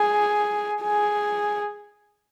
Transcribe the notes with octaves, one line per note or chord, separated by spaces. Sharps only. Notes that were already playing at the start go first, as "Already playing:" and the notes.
Already playing: G#4
G#4